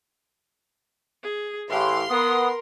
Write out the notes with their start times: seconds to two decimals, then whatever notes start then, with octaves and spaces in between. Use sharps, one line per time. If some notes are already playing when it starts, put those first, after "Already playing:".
1.23 G#4
1.70 A2 E3 G4 F5 C6
2.10 B3 A#4 D#6